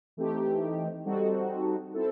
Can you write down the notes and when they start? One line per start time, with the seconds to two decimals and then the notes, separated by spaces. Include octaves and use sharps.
0.17 E3 A3 C4 D#4 G4
1.05 G3 C4 D#4 F#4 A4
1.94 C4 E4 A4